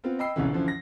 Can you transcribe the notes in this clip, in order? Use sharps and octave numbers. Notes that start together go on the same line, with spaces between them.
B3 C4 F4
D#5 G5 B5 E6 C7
G1 C2 C#3 E3
F#2 D3 E3 F3
A#6